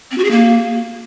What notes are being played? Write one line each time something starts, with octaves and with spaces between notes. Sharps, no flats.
C4
F#4
G#4
A#3